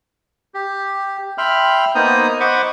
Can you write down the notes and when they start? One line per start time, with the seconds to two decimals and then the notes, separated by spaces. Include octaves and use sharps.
0.54 G4
1.38 E5 G5 B5 C6 F6
1.95 A#3 B3 D#4 C5 A#5 D#6
2.40 C5 D#5 F#5 B5 C#6 D6